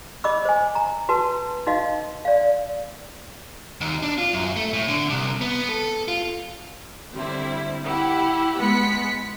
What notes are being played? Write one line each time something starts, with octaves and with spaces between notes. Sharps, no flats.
D#5 B5 D6 E6
C5 G#5
A#5
F#4 B4 A5
D#4 F#4 D#5 F5
D5 F5
D#2
D4
F4
F#2
A3
A2
D3
C2
B3
A4
F4
D3 G3 C4 E4
E4 G4 F#5
G#3 B3 B5 B6 C#7